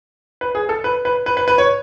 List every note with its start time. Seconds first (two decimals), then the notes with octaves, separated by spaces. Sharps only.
0.41 B4
0.55 G#4
0.69 A4
0.84 B4
1.05 B4
1.26 B4
1.37 B4
1.48 B4
1.58 C#5